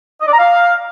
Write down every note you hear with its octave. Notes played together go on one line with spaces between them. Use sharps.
D#5
D5
A#5
F5